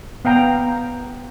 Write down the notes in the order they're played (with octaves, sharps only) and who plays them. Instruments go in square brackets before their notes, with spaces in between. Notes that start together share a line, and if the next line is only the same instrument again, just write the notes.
[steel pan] B3 F5 G5 A#5